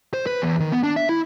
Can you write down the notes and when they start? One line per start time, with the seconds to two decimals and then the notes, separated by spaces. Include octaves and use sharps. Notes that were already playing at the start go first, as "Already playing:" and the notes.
0.14 C5
0.26 B4
0.42 E2
0.60 D#3
0.72 B3
0.83 D4
0.97 E5
1.09 E4